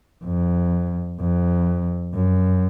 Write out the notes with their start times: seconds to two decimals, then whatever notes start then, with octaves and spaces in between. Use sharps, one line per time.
0.25 F2
1.20 F2
2.14 F#2